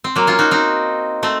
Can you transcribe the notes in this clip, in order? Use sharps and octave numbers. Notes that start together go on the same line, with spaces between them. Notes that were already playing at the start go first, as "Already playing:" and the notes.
C4
F#3 A#3
C#4 F4
D#4 F#4
C4 D#4
A3 C4